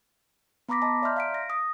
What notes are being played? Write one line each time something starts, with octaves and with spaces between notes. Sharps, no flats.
B3 A#5 B5 D6 A#6 B6
D#5 A5 A#5
D5 E5 A#5 C6 F6 G6
F5 B6 D7
A#6
D#6